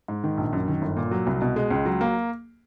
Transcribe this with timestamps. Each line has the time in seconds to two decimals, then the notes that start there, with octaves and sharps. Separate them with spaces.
0.08 G#2
0.24 D#3
0.38 A#1
0.53 F#2
0.68 D#3
0.82 G1
0.97 A#2
1.11 F#3
1.27 C2
1.41 B2
1.56 G#3
1.71 C#2
1.86 F#3
2.01 A#3